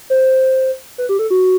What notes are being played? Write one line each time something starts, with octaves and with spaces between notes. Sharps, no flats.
C5
B4
G4
A4
F#4